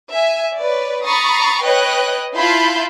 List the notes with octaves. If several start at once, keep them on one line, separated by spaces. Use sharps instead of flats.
E5 G#5
B4 C#5 D5
A#5 B5 C#6 D#6 A6 C7
B4 C#5 D#5 G5 F#6
E4 F4 A5 B5 C6 G6